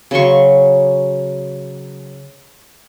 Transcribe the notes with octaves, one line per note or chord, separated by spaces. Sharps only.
C#3 F#3 C6 C#6